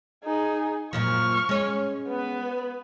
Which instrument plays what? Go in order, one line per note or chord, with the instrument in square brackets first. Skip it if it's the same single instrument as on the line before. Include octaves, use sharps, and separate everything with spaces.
[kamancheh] D#4 G#4
[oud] F#2 A#2 F3 [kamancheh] C#6 F6
[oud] G#3 C#4
[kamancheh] B3 B4